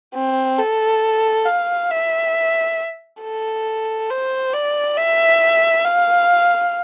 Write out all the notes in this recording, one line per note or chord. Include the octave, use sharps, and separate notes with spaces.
C4
A4
F5
E5
A4
C5
D5
E5
F5